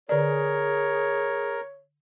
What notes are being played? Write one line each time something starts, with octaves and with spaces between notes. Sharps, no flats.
D3 G#4 A#4 C#5 D5